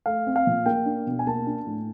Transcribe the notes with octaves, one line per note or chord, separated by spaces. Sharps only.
A3 F5
C4
F5
A#2
A#3 G5
D4
B2
G#5
A#3 A5
D4
A2